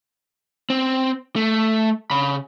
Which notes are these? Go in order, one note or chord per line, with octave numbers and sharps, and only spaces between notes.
C4
A3
C#3 B5